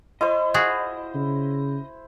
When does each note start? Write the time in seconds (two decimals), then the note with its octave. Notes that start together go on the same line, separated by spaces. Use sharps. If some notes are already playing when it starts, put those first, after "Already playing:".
0.21 E4 C5 D#5
0.54 F4 F#4 G#4
1.15 C#3